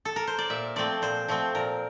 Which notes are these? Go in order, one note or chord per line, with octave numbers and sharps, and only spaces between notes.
A4
A#4
C5
D5
A#2 E5
F3 A3 C4 D5
A#2 C5
F3 A3 C4
A#2 A#4